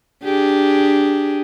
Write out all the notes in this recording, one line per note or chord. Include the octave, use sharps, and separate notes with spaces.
D4 G4 G#4